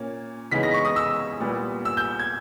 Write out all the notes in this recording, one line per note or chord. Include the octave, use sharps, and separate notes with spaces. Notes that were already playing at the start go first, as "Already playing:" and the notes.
Already playing: A#2 A#3 C#4
C#3 E3 G#3 B3 D#4 B6
A#6
C#6
D#6
E6
A#2 G3 B3
E6
G6
G#6